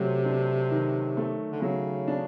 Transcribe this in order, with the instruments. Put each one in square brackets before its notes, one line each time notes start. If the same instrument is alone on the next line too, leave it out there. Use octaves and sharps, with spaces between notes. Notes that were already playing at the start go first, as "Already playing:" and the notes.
Already playing: [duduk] C3 [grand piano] F#3 A3
[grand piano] D4
D#3
A3
[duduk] D3
[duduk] C#3 [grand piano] F#3
[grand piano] D4